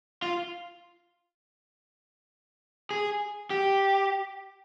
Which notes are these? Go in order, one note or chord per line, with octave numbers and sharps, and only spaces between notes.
F4
G#4
G4